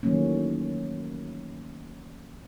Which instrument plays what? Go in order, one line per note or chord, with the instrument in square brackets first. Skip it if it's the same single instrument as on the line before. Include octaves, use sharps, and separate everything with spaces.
[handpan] D#3 E3 F#3 A3 A#3 C#4